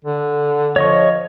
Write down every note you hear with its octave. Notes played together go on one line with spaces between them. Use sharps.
D3
F3 C#5 D#5 C#6